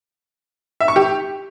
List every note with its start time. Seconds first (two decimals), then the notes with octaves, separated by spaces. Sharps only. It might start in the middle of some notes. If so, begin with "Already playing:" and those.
0.80 E5
0.88 C#6
0.96 G4